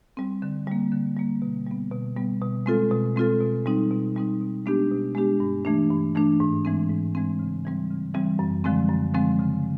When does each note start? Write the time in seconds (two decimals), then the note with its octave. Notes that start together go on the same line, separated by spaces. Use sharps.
0.17 G3 C4
0.42 D3
0.67 G3 A#3
0.92 D3
1.17 G3 A#3
1.42 B2
1.67 G3 B3
1.91 B2
2.17 G3 B3
2.42 B2
2.66 G#3 C4 F4 A4
2.91 B2
3.16 G#3 C4 F4 A4
3.41 B2
3.66 G3 C4 D#4
3.91 B2
4.16 G3 C4 D#4
4.41 B2
4.66 G#3 B3 D4 G4
4.91 B2
5.15 G#3 B3 D4 G4
5.40 G2
5.65 E3 A3 D4
5.90 G2
6.15 E3 A3 D4
6.40 G#2
6.65 E3 G#3 C4
6.89 G#2
7.15 E3 G#3 C4
7.39 C#3
7.65 E3 G3 C4
7.90 C#3
8.14 E3 G3 C4
8.39 F#2
8.64 D3 F3 G#3 C4
8.89 F#2
9.14 D3 F3 G#3 C4
9.39 C#3